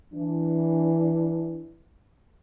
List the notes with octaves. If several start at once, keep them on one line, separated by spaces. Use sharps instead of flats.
E3 D4